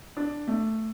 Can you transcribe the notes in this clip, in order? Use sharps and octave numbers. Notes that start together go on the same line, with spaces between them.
D4
A3